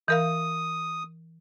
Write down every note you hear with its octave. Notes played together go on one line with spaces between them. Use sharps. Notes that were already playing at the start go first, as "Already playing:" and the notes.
E3 A#4 F5 D#6